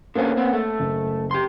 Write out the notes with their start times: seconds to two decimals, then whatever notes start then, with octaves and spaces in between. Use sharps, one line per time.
0.15 D3 A#3 B3 C#4 C5 C#5
0.37 B3 C4
0.53 A3
0.80 F#1
1.31 G4 C6